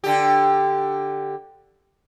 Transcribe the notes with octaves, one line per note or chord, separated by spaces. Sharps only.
D3 G4